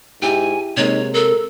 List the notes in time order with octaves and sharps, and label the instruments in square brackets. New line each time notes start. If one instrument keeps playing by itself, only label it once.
[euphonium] G#2 [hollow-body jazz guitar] E4 G4 [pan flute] G#5
[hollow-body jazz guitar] C3 G#3 A#3 [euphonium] D#4 [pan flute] C#5
[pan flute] A4 [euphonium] A#4